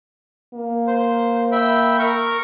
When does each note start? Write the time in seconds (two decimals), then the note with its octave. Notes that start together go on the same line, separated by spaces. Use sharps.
0.54 A#3
0.87 C5
1.52 E5 G5 B5
1.99 A#4 C#6